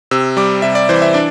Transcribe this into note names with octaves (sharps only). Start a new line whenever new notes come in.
C3 E6
G3 D6
C3 E5
D5
E3 C5
E5
D4 D5